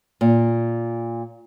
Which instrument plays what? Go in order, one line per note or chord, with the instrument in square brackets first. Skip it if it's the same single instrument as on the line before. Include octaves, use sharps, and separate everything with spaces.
[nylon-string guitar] A#2